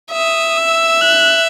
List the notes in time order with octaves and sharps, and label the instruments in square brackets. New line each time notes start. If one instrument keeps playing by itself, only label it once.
[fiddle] E5 [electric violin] D#6
[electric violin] E6
F#6